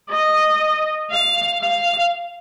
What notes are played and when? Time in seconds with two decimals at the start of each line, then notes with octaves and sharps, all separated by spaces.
0.10 D#5
1.11 F5
1.62 F5